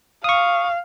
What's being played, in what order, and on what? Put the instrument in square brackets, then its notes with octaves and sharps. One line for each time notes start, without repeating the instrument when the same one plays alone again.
[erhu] F5 [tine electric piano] C#6 D#6